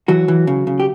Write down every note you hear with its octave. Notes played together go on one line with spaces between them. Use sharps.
E3 F#3 F#4
E3
C#3
C#3
G4